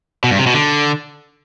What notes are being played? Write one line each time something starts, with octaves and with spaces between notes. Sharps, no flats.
B2
G2
C3
B2
D3